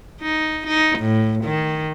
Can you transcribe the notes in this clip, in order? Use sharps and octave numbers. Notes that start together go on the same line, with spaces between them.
D#4
D#4
A2
D#3